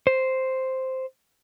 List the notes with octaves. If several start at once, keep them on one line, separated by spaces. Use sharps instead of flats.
C5